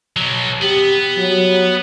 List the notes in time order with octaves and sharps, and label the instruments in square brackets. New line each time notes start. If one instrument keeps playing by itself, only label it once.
[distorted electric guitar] B2 F#3
[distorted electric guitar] B3 [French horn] G4
[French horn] F#3